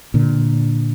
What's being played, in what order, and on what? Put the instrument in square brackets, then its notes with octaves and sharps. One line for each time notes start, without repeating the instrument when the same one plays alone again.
[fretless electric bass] A#2 D3